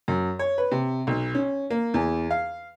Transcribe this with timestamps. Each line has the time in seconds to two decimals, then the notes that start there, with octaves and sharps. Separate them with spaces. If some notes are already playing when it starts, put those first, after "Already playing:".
0.08 F#2
0.39 C#5
0.58 B4
0.72 C3
1.07 B1
1.35 C#4
1.70 A#3
1.94 E2
2.31 F5